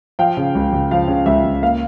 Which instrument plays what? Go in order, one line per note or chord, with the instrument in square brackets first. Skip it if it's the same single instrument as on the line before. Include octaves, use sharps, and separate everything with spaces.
[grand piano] F3 [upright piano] F5 G5
[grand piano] C#3
C#2
C#2
[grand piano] F3 [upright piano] F5
[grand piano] C#3
[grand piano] C#2 [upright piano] E5
[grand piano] C#2
[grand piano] A#3 [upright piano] F5